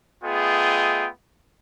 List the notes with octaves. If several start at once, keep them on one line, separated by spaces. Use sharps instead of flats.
A3 B3 F4 G#4 D#5 G5